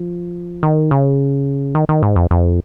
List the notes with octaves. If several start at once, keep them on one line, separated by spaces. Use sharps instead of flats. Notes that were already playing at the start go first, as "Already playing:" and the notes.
Already playing: F3
D#3
C#3
D#3
D#3
G#2
F2
F2